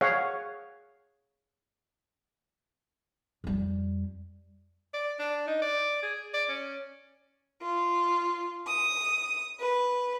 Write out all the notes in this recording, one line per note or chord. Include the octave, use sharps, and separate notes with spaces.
G#4 C#5 F5 F#5
F2 G3
D5
D4
D#4
D5
G#4
D5
C#4
F4
D#6
B4